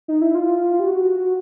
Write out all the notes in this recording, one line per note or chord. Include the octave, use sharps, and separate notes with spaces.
D#4
E4
F4
G4
F#4